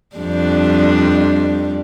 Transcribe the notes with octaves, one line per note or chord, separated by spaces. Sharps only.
F2 G3 D4